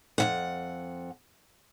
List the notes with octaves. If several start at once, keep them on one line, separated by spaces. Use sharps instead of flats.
F2 E3 F#5